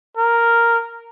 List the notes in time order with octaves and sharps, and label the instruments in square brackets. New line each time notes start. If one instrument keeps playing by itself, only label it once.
[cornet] A#4